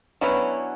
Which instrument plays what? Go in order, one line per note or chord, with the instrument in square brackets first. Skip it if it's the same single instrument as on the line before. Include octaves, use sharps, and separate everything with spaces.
[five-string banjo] F#3 C#4 E4 B4 [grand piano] B3 D4